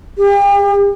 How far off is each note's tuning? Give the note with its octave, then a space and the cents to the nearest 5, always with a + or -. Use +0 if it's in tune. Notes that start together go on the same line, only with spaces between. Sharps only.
G4 +40